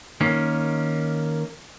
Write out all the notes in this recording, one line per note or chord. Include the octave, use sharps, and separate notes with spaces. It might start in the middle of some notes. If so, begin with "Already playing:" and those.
D#3 A#3 C#4